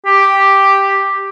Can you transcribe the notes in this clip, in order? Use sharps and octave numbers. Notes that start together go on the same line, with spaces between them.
G4